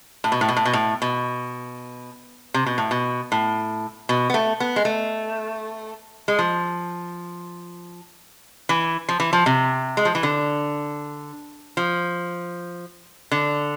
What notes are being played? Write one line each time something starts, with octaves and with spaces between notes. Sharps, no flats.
A2
B2
A2
B2
A2
B2
A2
B2
C3
B2
A2
B2
A2
B2
B3
A3
B3
G#3
A3
G#3
F3
E3
F3
E3
F3
C3
G#3
F3
E3
D3
F3
D3